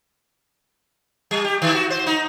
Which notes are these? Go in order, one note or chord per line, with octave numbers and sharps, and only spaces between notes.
G3
G4
D#3
F#4
C5
D#4